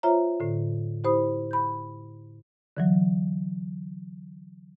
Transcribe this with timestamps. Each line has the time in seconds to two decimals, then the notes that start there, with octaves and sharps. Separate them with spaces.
0.03 F4 C5 C#5 E5 A#5
0.40 A2 D3
1.04 E4 G4 C5 B5 D#6
1.51 B5 G6
2.77 D3 E3 F#3